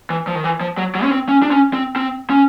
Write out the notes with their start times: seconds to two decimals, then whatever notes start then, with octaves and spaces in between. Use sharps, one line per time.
0.10 E3
0.27 F3
0.35 D#3
0.44 E3
0.61 F3
0.78 F#3
0.95 F#3
1.03 C#4
1.12 C4
1.28 C#4
1.42 D4
1.51 C#4
1.73 C4
1.96 C4
2.30 C#4